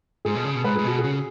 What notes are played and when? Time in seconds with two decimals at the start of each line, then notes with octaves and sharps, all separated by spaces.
0.25 G#2 G#4
0.35 B2
0.45 C#3
0.55 B2
0.64 G#2 B4
0.76 G#2 G#4
0.84 B2 F#4
0.99 G#4
1.04 C#3